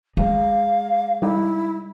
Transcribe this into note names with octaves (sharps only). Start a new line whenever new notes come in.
G#3 F5
G3 D#4 E4